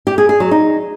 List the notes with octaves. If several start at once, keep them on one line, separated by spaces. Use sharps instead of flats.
G4
G#4
G#4
F#3
D#4